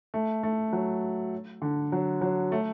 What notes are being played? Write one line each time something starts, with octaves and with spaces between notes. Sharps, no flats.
A3
A3
F#3
D3
F#3
F#3
A3